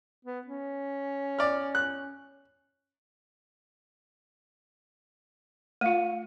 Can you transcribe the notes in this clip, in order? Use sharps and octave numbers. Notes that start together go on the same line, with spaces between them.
B3
C#4
D5 F6
F#6
A3 F4 F5 D#7